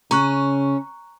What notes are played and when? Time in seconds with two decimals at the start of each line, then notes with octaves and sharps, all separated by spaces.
0.11 C#3 C#4 A#5 C#6 F#6